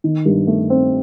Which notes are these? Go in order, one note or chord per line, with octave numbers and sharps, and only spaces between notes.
D#3
G2
A3
C4